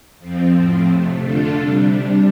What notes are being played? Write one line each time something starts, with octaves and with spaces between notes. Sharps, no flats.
F2 F3 C4
A2 F3 C4
F2 C3 A3
D3 A3 D4 F4 A4
C3 G3 D4
C3 G3 D4